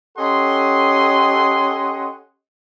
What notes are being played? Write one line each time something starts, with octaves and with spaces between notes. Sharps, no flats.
C#4 G4 A4 D#5 F#5 C6